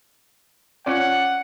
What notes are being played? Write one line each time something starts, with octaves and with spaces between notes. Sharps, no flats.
C#4 F4 D5 F#5